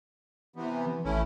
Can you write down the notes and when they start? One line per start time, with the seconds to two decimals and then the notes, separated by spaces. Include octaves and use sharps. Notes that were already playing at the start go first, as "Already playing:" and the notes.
0.56 C3 E3 B3
0.86 E3
1.04 A1 A3 C#4 E4